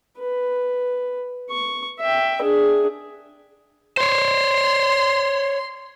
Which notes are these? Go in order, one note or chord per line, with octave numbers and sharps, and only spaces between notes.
B4
C#6
E5 G5
D4 G#4
C5 C#5 C6